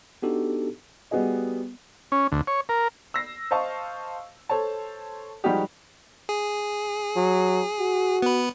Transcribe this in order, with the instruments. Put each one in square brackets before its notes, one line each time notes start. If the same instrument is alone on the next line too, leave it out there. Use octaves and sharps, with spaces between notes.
[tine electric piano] B3 D4 D#4 F#4 G4 A4
[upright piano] G3 B3 F#4 G#4 D#5
[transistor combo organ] C#4
D2
C#5
A#4
[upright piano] E6 A#6 C7
C5 D#5 F5 A5 C#6
A4 C5 C#5 A5
F3 G3 G#3 D#4 F#4 G4
[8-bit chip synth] G#4
[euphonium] F#3
F#4
[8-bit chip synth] B3 B4